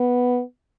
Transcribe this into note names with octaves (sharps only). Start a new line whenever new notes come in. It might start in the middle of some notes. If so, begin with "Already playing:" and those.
Already playing: B3